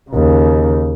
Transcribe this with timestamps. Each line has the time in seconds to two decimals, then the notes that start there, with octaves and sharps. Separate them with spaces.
0.10 D#2 C#3